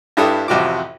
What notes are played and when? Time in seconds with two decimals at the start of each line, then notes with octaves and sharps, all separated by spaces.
0.17 G2 D4 E4 G4 A4 D#6
0.48 A1 F2 C3 F#4 D6